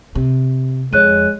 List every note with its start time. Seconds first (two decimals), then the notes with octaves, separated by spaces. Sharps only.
0.15 C3
0.93 F2 G#3 C#5 F#6 D#7